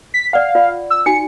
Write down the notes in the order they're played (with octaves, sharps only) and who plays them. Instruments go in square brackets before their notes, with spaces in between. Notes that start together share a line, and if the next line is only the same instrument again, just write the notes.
[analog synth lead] B6
[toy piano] D5 F#5 [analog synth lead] F5
[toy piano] F4 D5
[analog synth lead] E6
[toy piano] D#4 F#4 G#5 [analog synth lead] C#7